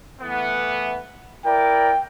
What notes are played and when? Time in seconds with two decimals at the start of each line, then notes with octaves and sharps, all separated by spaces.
0.21 E3 A3 B3
1.45 E4 A#4 D5 G5